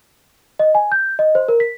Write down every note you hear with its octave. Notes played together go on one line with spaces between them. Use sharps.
D#5
G#5
G6
D#5
C5
A#4
B6